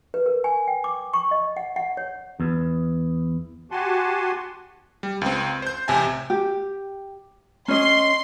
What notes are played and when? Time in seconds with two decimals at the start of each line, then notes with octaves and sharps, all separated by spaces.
0.14 B4
0.26 A#4
0.44 G#5
0.67 G5
0.84 D6
1.14 C#6
1.31 D#5
1.57 F#5
1.76 F#5
1.97 C#5
2.40 E2
3.71 F#4 G4 F#5 G#5 A5 C6
5.03 G3
5.21 C#2 C4
5.62 C5 G6
5.88 A1 C3 E5 G#5 A5
6.30 G4
7.68 C#4 D#5 C6